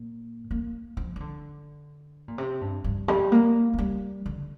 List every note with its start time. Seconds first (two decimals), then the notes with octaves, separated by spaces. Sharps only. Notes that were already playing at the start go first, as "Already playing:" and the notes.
Already playing: A#2
0.51 A#3
0.97 F3
1.16 F3
1.20 D3
2.28 A#2
2.38 C3
2.61 G2
2.84 G2
3.08 G3
3.32 A#3
3.74 A#3
3.78 G3
4.26 D3